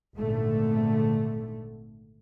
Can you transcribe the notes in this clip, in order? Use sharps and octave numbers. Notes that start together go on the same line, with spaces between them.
G#1 A#2 D3 A3